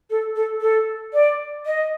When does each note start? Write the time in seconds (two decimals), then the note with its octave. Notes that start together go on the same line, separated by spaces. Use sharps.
0.10 A4
0.36 A4
0.61 A4
1.13 D5
1.66 D#5